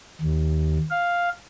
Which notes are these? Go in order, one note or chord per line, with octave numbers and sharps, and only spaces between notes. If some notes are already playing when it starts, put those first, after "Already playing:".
D#2
F5